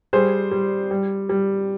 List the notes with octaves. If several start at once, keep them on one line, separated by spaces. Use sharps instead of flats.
G3 G#4 C5
G3
G3
G3